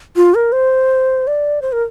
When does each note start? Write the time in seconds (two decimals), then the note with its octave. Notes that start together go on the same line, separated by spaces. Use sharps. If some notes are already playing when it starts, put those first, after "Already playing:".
0.16 F4
0.35 A#4
0.52 C5
1.27 D5
1.62 C5
1.72 A#4